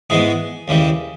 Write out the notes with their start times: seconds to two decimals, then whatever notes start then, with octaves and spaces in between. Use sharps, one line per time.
0.10 G#2 E3 G#3 B3 G#4
0.68 D#2 C#3 E3 G3